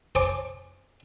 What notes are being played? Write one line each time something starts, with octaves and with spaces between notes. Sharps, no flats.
C5 C#5 G#5 A5 C#6 D6